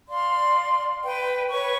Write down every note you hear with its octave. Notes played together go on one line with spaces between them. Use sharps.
D5 F5 C6
B4 G5
B4 C#5 C#6